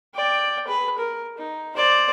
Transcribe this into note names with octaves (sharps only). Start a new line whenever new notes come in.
D5 G5
G#4 B4
A#4
D#4
C5 D5